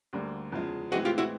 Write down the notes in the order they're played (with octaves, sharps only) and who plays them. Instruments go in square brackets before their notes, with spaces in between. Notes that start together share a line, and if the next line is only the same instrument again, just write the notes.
[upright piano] D2 D3 G3 A#3
E2 C#3 F3 G#3
[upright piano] A2 E3 G#3 C4 [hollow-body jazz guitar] F#4 G#4
[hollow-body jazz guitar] F4 G4
E4 F#4